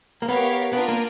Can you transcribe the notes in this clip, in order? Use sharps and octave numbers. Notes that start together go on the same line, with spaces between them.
A#3
B3 G4 A#4 C#5 F5
B3 D4 F4 A#4
A#3